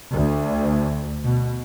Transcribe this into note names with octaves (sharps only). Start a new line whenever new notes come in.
D2
B2